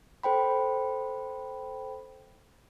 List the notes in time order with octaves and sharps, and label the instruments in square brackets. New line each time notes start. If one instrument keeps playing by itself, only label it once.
[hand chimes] A4 C5 G5 B5